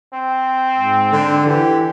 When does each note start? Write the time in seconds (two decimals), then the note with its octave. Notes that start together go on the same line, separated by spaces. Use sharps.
0.13 C4
0.75 G#2
1.12 D3
1.46 E3 G4